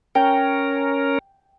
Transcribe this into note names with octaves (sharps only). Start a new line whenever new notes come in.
C#4 A#4 G5